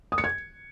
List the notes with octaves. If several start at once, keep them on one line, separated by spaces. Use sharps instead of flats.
D#6
C#7
G#6